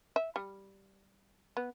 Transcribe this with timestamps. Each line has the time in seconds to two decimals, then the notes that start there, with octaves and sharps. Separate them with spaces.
0.16 E5
0.36 G3
1.57 B3